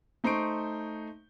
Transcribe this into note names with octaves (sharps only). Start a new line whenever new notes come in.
A3 D#4 C5 C6 C#6 D7